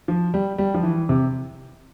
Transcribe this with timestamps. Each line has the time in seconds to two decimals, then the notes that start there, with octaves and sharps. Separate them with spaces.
0.08 F3
0.34 G3
0.58 G3
0.74 F3
0.83 E3
1.09 C3